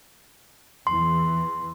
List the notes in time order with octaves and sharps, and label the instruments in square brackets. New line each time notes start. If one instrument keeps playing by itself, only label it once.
[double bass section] E2 E3 [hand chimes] C6